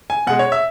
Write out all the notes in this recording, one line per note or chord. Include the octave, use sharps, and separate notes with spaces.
G#5
B2 G#3 F#5
C#5
E5